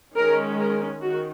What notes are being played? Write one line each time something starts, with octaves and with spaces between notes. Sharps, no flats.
D#3 G#3 C#4 A#4
A#4
D#3 F#4